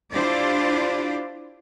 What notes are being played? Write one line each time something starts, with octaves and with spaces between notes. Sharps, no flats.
D4 E4 F4 G4 C5 D5